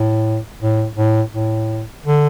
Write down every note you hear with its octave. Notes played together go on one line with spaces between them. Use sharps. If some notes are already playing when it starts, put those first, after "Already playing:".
Already playing: A2
A2
A2
A2
D3